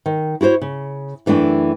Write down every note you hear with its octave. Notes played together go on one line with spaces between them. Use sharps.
D#3
E4 F#4 G#4 C5 C#5
C#3
F#2 E3 A3 D4 G5